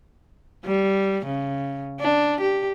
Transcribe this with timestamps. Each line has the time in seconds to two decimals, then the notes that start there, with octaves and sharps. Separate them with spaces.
0.64 G3
1.27 C#3
2.00 D4
2.41 G4